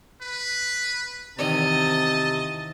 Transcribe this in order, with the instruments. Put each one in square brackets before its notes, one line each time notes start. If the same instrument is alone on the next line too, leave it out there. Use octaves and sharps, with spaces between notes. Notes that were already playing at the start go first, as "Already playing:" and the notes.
[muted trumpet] B4
[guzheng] E2 D#3 A#5 [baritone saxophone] C3 [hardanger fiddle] D#5 [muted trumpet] A5